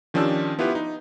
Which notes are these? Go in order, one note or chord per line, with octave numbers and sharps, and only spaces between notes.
D#3 F3 C#4 D4 G4 E6
B3 E4 F4 G4 B4
D#4